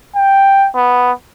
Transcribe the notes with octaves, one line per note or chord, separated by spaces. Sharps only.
G5
B3